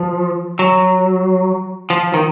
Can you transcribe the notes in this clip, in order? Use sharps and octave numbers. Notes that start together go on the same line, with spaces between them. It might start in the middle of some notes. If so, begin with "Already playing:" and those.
Already playing: F3
F#3
F3
D#3